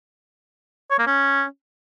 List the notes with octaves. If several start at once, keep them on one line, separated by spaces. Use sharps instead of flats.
C#5
A#3
C#4